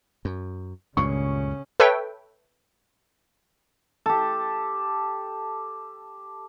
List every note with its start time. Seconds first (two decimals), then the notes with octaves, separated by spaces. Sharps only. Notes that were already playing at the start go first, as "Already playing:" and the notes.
0.25 F#2
0.97 C#2 G2 A#2 C#3 C#4 C#6
1.80 A4 B4 C#5 E5 G5
4.06 G4 A4